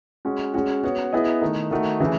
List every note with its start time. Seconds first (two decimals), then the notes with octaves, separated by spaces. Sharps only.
0.25 G#3 C#4 F#4
0.54 G#3 C#4 F#4
0.83 B3 F#4 C#5
1.13 B3 E4 G#4 D#5
1.41 D#3 A3 D#4
1.71 D#3 A3 D#4 F#4
2.00 C#3 E3 A3